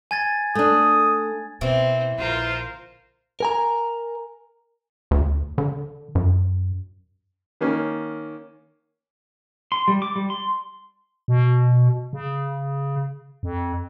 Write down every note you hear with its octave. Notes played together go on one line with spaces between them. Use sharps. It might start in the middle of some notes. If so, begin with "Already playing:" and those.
G#5 G#6 A6
A3 D4 D#6
B2 E3 C4
A#1 D3 F4 A#4 C5
A#4 G#5 A#5
D2
D3
F#2
D#3 A#3 C#4
C6
G3
D6
G3
C6
B2
C#3
F2